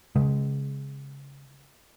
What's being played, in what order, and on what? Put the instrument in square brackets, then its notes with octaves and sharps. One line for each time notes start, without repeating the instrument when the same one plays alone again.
[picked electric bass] C#3 G#3